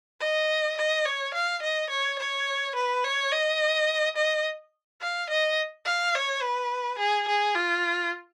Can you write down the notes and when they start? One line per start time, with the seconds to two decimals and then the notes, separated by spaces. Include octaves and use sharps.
0.21 D#5
0.77 D#5
1.06 C#5
1.34 F5
1.62 D#5
1.90 C#5
2.19 C#5
2.75 B4
3.04 C#5
3.32 D#5
4.16 D#5
5.01 F5
5.30 D#5
5.86 F5
6.15 C#5
6.42 B4
6.99 G#4
7.28 G#4
7.56 F4